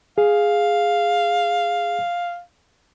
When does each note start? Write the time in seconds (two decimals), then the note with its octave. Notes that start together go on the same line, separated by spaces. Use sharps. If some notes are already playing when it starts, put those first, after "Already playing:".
0.18 G#4 F5